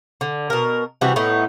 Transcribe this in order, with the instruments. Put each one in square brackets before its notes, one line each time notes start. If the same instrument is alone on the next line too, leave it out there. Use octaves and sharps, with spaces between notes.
[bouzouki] D3
B2 A#4
C3 E3 G3 F#4
A2 B3 D#4